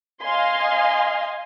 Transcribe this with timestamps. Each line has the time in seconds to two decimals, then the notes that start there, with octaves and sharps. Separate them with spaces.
0.22 D#5 F5 G#5 C6